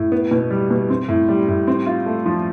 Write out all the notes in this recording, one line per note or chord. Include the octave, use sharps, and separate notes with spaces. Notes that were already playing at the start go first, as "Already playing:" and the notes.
Already playing: A2
B3
B2
G3
B2
C4
A2
G3
A2
C4
F4
A3
F3